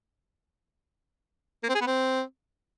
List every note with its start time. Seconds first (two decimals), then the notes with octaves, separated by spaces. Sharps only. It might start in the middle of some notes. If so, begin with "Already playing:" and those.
1.63 A#3
1.69 C4
1.75 G#4
1.81 B3
1.87 C4